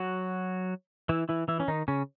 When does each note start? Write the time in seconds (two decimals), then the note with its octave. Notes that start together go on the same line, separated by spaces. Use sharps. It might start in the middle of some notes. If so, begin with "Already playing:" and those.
Already playing: F#3 F#4
1.09 E3 E4
1.29 E3 E4
1.48 E3 E4
1.60 C#4
1.68 D#3 D#4
1.88 C#3 C#4